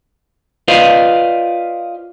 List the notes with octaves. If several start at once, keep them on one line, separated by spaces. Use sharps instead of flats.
F4 B4 C5 D5 D#5 F5